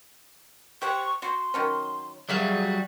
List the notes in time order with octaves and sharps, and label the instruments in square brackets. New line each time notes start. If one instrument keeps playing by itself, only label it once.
[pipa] G4 C5 F#5 [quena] C#6
[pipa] F#4 [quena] C6
[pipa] D#3 F#3 C#4
[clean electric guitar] F#3 G3 F#4 [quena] G#4 [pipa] D5 E5 F5